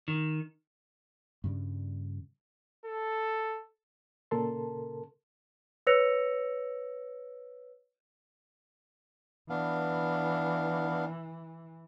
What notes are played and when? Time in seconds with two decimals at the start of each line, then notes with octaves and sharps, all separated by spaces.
0.08 D#3
1.44 G2 C#3 G3
2.86 A4
4.31 A#2 C#3 A4 A#4 A5 C6
5.87 B4 C#5 E6 A#6 C#7 F7
9.50 E3 B3 D4 F5